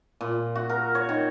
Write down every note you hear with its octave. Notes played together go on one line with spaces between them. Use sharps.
A#2
F#4
A#4
C#5
D#3